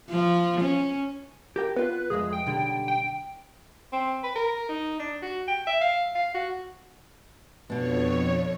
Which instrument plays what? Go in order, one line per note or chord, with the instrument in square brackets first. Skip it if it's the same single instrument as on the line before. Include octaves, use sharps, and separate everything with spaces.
[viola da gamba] F3
C#4
[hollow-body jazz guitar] G4 A#4 G5
[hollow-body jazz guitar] B3 F4 [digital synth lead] B4
[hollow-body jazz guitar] C2 F2 G#3 [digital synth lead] G#4
[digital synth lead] G5
[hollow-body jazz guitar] B1 D3 G3
[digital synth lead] G5
[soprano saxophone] C4
B4
A#4
D#4
D4
F#4
G5
E5
F5
F5
F#4
[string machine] F2 C#5 [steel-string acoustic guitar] B2 D4 [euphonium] B3